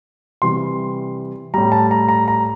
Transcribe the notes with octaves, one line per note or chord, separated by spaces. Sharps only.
C3 E3 G3 C6
A2 G3 A#5
A5
A#5
A#5
A#5